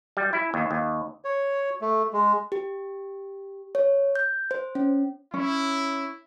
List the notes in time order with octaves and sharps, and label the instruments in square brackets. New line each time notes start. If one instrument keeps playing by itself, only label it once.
[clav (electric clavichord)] G3
E4
D#2
D#2
[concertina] C#5
A3
G#3
[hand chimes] G4
C#5
G6
C5
C#4
[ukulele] C#4 [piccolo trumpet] E4